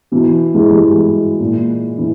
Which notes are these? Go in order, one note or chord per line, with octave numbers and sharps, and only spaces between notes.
B2 E3
E3 G#3
G3
E3 G#3
A#2
E3